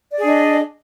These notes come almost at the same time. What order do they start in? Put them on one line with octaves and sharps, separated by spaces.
D5 G#4 D4 D#5